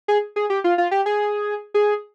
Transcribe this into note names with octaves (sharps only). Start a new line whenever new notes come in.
G#4
G#4
G4
F4
F4
G4
G#4
G#4